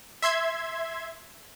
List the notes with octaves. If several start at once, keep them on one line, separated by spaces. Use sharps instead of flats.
E5 C6 G#6